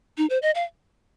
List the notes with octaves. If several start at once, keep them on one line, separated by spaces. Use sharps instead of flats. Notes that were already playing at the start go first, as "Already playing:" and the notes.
D#4
C5
D#5
F5